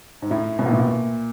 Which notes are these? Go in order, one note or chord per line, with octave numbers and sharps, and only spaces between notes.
G#2
A2
B2
A#2
A2
A#2